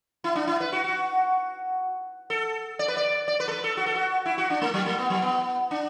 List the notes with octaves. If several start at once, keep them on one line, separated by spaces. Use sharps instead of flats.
E4
D4
E4
B4
F#4
F#4
A4
D5
B4
D5
D5
B4
A4
B4
A4
F#4
A4
F#4
E4
F#4
D4
A3
F#3
A3
B3
F#3
B3
D4